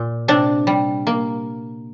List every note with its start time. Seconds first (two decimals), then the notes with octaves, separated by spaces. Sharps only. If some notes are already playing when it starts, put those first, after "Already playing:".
Already playing: A#2
0.28 C3 D4
0.67 G3
1.07 A#3